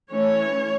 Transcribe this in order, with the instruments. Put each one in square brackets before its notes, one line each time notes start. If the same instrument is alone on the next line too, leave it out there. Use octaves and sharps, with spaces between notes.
[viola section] E3 A3 C#4 C#5